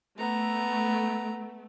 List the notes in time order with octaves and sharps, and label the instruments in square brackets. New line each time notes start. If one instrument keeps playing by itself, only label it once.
[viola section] A3 [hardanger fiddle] B3 A#5